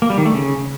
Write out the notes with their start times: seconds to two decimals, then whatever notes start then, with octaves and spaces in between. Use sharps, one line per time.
0.02 A#3
0.10 G3
0.18 D#3
0.25 A3
0.33 C#3